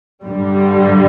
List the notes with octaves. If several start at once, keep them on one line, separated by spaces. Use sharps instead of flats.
G2 D3 G3